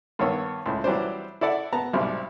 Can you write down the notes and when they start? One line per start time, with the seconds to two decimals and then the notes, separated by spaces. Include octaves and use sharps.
0.19 G2 D#3 B3 C#5 E6
0.66 C#2 A2
0.84 E3 F#3 G3 C4 D4 C5
1.41 E4 A4 D5 F#5
1.73 B3 A5 A#5
1.93 B1 G#2 C3 G3 D4 F6